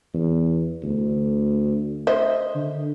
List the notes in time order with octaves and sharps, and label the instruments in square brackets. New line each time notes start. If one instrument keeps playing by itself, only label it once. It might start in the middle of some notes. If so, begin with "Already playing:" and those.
[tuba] E2
D2
[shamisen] C5 D#5 E5
[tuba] D3